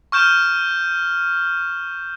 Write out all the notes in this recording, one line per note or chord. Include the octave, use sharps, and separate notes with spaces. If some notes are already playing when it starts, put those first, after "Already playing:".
C#6 F6 G6 E7